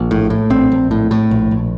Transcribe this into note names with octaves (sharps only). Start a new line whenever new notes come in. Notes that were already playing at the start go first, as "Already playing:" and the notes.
Already playing: A#1 A#3
A2
A2
A#1 C4
A#1
A2
A2
A#1
A#1